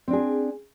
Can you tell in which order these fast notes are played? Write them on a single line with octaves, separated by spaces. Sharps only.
C4 D4 G#4